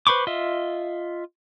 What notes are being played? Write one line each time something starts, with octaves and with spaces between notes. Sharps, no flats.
B4 C5 B5 C#6 D6
F4 D#5 E5